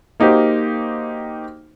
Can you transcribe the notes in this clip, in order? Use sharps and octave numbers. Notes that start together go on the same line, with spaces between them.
A#3 D#4 F#4 G4 C5